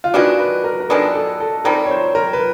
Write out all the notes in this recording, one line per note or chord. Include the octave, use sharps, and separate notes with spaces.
F4
D#3 G#3 B3 D4 F#4
B4
A#4
A#4
D#3 G#3 B3 D4 A4
A4
A4
D#3 G3 C4 A#4
C#5
C5
A#4
B4